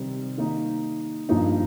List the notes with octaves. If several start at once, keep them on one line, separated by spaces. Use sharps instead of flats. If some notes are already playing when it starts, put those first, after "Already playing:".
Already playing: C3 D#3 G3 C4 D#4
D#3 A#3 D#4
G2 F3 A#3 D#4